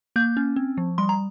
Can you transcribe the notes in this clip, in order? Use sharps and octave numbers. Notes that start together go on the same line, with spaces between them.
A#3 G6
C#4
C4
F3
G3 C6
A#5